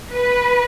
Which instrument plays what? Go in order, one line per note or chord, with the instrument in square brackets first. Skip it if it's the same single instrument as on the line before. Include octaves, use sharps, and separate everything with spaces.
[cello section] B4